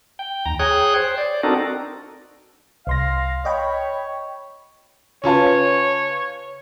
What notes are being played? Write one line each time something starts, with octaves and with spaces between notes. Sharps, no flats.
G5
D#2 A#5
G#4 C#5 G5 D#6 F#6
C5
D5
C4 D4 D#4 F#4 A4 A#4
C2 F5 C6 A#6
C#5 D#5 G5 B5
C#3 C#4 F4 B4 C#5 A5